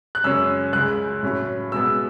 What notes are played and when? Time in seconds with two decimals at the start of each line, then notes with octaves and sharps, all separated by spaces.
0.15 F#6
0.24 F#2 C#3 G#3 C#4 E6
0.73 C#2 C#3 G#3 F#6
1.23 A2 F#3 C#4
1.72 B2 G#3 B3 E6